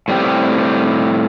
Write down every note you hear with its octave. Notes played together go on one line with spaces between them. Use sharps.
A2 G3 C4 G4